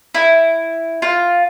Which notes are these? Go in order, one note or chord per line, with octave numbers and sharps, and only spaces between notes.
E4
F4